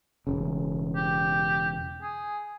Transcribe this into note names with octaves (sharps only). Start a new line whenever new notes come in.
E1 A#1 C#3
G4
G#4